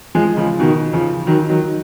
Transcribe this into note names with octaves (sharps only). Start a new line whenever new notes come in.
F3 G#3
C#3 F3
B2 D#3
C#3 F3
D#3 F#3
D#3 F#3